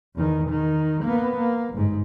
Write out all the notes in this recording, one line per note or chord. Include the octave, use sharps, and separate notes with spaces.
E2 D#3
D#3
A#3 B3
A#3
G1 G#2